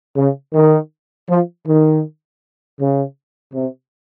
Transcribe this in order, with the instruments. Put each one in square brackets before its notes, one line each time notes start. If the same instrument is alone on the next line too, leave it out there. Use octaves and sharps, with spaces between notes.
[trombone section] C#3
D#3
F3
D#3
C#3
C3